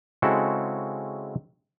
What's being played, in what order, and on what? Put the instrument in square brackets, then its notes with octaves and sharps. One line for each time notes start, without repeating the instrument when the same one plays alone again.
[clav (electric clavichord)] C#3 G#3 C4 E4 F#4 A4